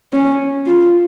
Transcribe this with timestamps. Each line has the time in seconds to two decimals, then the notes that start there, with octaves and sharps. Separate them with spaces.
0.13 C#4
0.67 F4